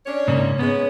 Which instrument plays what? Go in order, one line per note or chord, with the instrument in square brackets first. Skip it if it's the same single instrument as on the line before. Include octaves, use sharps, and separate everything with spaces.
[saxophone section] C#4 D4 C#5
[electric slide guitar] G#2 C#3 A#3
[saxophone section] G#3 C#4 [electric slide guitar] B3